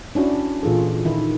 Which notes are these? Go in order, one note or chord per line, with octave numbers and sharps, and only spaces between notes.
C#4 D4 E4 F#4
A#2 E3 F4 G#4 A4
D#3 E4